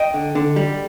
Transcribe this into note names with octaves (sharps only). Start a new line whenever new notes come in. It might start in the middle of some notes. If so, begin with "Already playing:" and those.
Already playing: D#5 G5
D3
D3
G3